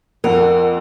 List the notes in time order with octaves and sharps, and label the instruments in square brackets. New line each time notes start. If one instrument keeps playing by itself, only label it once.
[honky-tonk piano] F2 F#5 [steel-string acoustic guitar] A#4